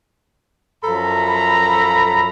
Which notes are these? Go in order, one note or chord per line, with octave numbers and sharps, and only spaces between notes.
F#2 F3 A4 A#5 B5